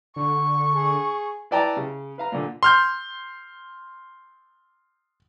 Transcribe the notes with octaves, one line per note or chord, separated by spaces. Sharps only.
D3 C#6
G#4
E4 B4 D5 G5 A5 A#5
C#3
B4 F5 A#5
A#2 D3
C6 F6 G6